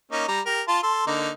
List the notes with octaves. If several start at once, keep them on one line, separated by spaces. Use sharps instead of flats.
A#3 C#4 D#4
G3 A#5
G4 A#4
F4 A5 C6
A4 C6
D3 A#3 D#4